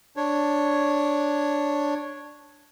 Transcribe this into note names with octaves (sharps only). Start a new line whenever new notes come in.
D4 C#5